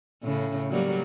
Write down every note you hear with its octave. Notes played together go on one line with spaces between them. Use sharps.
A2 C#3
F#3 G3 A#3